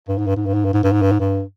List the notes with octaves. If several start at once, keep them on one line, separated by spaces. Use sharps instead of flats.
G2
G#2
G2
G#2
G2
G#2
G2
G#2
G2
G#2
G2
G#2
G2